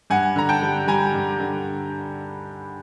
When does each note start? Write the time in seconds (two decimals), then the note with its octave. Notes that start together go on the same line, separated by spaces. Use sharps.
0.10 G2 F#5 G#5
0.36 D3 A#5
0.49 G5 A5
0.62 G3
0.87 G3 G#5 A#5
1.14 G2
1.39 D3